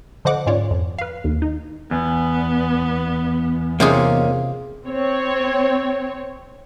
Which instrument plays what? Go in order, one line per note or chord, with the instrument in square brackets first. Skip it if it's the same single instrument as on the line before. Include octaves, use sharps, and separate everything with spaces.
[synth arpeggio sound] D3 F3 C5 D#5 F#5 D6
G#2 C#4 F4 C#5 D5
F2
B4 F5
D#2
D#4
[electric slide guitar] E2 [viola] B3
[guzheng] C3 F4 G#4 [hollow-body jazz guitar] A#3 C#4 D#4
[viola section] C4 C#5